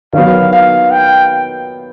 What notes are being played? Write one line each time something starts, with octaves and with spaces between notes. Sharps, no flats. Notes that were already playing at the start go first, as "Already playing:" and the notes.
D#3 F#3 B3 F5
F5
G5